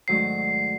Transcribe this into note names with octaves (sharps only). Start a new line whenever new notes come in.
G#2 D#3 F#3 A3 D4 C7